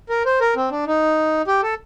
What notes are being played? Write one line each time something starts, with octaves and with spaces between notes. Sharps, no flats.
A#4
C5
A#4
C4
D4
D#4
G4
A4